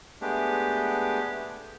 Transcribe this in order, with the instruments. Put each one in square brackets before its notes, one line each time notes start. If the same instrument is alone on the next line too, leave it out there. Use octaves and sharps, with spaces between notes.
[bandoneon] G#3 A3 B3 D4 G4